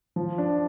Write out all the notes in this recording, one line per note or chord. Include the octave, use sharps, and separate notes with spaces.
F3
D4